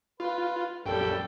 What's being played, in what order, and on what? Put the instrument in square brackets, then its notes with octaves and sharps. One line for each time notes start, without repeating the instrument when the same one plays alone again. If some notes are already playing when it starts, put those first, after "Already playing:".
[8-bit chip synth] F4 [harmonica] B4
[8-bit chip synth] A#1 F#2 G5 [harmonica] G3 A4